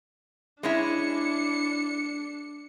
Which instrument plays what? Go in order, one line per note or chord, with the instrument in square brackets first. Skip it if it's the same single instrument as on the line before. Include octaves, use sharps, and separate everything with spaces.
[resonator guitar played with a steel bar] G#3 C#4 E4 [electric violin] D4 C#7